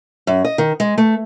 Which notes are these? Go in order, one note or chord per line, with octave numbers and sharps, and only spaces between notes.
F#2
D#5
D#3
G#3
A3